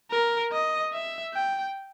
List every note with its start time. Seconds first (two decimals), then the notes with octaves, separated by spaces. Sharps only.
0.11 A#4
0.52 D#5
0.93 E5
1.34 G5